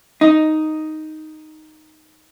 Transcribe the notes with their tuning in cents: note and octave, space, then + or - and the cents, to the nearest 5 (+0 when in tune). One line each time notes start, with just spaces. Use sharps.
D#4 +0